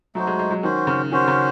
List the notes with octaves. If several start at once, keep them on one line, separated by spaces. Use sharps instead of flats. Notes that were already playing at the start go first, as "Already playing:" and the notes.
F#3 A3 D#4 F#4 C5
G#3
G#3
F#3
D#3 C#4 F#4 C5
C#3
D#3 C#4 F#4 C5
C#3